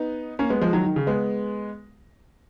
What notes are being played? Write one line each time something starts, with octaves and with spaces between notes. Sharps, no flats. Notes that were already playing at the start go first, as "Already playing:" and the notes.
Already playing: B3 D#4
A#3 C#4
G#3 B3
F3 G#3
D#3 F#3
D#3
C#3
G#3 B3